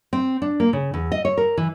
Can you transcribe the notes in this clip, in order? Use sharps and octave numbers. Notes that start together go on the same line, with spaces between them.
C4
D4
A#3
C#3
E2
D#5
C#5
A#4
E3